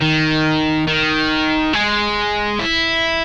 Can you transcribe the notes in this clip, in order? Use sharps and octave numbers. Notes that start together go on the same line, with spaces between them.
D#3
D#3
G#3
E4